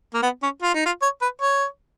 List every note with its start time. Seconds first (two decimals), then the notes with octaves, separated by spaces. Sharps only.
0.14 A#3
0.23 B3
0.43 C#4
0.62 F4
0.75 D#4
0.86 F4
1.02 C#5
1.22 B4
1.41 C#5